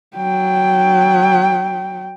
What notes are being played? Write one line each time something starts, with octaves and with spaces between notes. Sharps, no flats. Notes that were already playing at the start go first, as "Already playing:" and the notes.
F#3 G5